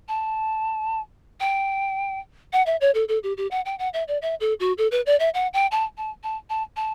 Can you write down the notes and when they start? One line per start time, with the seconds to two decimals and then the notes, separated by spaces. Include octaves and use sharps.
0.08 A5
1.40 G5
2.53 F#5
2.66 E5
2.81 C#5
2.94 A4
3.08 A4
3.23 G4
3.37 G4
3.51 F#5
3.65 G5
3.79 F#5
3.94 E5
4.08 D5
4.22 E5
4.40 A4
4.60 F#4
4.78 A4
4.91 B4
5.06 D5
5.20 E5
5.34 F#5
5.54 G5
5.71 A5
5.97 A5
6.23 A5
6.50 A5
6.76 A5